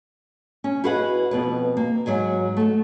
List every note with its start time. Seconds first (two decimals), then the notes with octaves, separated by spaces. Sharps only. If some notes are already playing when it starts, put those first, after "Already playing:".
0.64 C#4
0.84 E4 F#4 G#4 B4 D#5 F#5
1.31 F2 B2 B4
1.77 A#3
2.06 G#2 F#3 G#3 G#5
2.57 A3 F#4